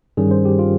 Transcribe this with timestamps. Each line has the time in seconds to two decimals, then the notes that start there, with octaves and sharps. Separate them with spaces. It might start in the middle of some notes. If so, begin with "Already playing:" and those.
0.17 G2 D#3 G3 C#4 G#4
0.31 C5
0.45 G4
0.59 F4